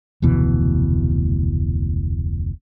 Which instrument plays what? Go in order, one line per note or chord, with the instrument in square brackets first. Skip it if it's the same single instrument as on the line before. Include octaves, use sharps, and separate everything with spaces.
[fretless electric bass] F1 D2 B2 E3